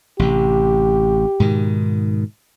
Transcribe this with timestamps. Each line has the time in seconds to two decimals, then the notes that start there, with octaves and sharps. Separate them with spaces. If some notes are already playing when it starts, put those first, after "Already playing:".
0.19 A1 C3 G4
1.40 G#2 B2 D#3